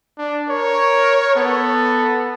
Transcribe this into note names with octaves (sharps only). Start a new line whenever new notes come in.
D4
A#4 C#5
B3 A4